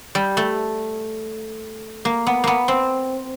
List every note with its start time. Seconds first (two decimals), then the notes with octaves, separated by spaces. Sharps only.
0.15 G3
0.37 A3
2.05 A#3
2.27 B3
2.44 A#3 B3
2.68 C4